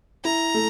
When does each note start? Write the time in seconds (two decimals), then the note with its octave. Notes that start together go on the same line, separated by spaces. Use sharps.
0.24 E4 A#5
0.54 A3